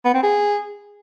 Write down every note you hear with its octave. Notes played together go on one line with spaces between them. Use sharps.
B3
C4
G#4